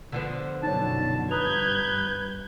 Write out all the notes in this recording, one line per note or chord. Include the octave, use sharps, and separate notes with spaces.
D3 F3 B3
F#2 B2 D#4 C#5 A5
G2 B4 A#5 D#6 G6 G#6 F7